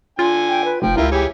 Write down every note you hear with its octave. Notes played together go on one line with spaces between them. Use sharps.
D3 F4 G#5
G5
B4
F1 F3 G5
C#2 E4 F4 G4 A#4
E3 G4 G#4 C#5